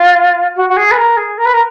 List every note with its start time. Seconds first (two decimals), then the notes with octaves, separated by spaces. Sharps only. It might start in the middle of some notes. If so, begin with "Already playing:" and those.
Already playing: F4
0.56 F#4
0.69 F#4
0.76 G#4
0.91 B4
0.97 A#4
1.17 G#4
1.37 A#4
1.45 B4
1.53 A#4